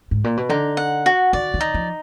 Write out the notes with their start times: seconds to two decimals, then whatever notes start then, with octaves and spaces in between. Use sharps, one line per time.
0.11 G#2
0.24 A#2
0.37 B2
0.49 D3 D#4
0.77 F#5
1.06 F#4
1.33 D#3 D5
1.54 D#3
1.61 D#4
1.74 F3